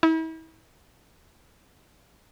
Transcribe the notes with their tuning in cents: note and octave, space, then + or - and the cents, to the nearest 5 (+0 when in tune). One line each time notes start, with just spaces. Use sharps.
E4 -40